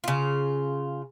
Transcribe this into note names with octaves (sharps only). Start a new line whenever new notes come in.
C#3 F4